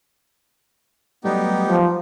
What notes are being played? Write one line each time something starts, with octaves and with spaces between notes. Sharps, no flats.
F#3 G3 A3 B3 D#4 G4
F3